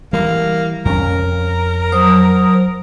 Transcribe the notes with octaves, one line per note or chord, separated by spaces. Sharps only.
E3 G3 A#3
F2 C#4 A#4
F#3 C5 D#6